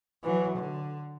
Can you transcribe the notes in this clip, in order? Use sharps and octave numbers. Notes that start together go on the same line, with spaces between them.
E3 F#3
D3